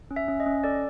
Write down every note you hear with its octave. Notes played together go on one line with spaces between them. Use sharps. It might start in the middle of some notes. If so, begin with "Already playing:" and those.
C#4
E5
C#4
D#5
C#4
A4 D5